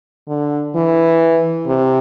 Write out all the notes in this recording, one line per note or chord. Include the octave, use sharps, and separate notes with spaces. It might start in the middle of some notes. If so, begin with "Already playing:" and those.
D3
E3
C3